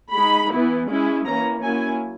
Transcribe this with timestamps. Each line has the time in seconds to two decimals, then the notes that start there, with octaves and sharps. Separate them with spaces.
0.13 G#3 D#4 B5
0.50 E3 B3 E4
0.87 G#3 C#4 E4
1.24 E3 A#3 C#4 A#5
1.61 F#3 A#3 C#4 E4 G#5